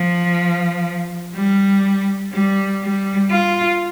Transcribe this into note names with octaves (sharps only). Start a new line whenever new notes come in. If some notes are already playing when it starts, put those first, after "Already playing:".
Already playing: F3
G3
G3
G3
F4